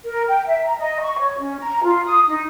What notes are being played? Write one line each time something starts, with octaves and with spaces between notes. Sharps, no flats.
A#4
G5
E5
A#5
D#5
C#6
C#5
C#4
A#5
F4
D#6
D#4